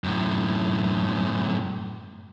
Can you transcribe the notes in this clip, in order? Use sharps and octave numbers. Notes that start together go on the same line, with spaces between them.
F#2 A2